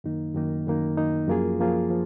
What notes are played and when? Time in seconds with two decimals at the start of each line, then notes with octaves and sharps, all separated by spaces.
0.04 F#2 D#3 A#3 D#4
0.35 F#2 D#3 A#3 D#4
0.67 F#2 D#3 A#3 D#4
0.98 F#2 D#3 A#3 D#4
1.28 F#2 F3 A#3 F4 G#4
1.59 F#2 F3 A#3 F4 G#4
1.90 F3